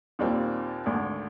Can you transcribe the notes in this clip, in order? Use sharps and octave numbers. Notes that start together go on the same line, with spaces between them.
D#2 A#2 G3 C4
G#1 D2